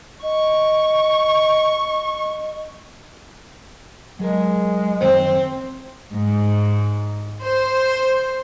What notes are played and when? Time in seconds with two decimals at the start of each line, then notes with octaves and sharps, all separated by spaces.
0.23 D#5 C#6
4.19 F#3 G#3 G#4 A#4
5.01 F#2 D#3 F3 C4 C5
6.11 G#2
7.42 C5